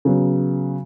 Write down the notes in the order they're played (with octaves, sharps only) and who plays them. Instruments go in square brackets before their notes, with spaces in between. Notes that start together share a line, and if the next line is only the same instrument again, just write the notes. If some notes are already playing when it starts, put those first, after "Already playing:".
[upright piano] C#3 F#3 B3